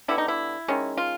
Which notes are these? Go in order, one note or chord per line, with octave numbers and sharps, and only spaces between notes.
D3 G3 B3 E4
D#4
E4
D#3 G#3 C#4
F4